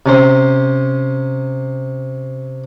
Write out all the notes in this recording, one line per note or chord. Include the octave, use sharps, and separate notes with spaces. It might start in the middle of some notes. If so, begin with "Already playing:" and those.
C3 C#4 C5